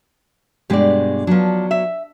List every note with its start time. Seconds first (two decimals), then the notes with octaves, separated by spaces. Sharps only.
0.70 G2 B2 G#3 G4 D5
1.27 F3 F#3 B3 D4
1.71 E5